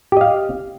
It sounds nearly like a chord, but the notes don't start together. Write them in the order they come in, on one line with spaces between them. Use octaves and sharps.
G4 D#5 F5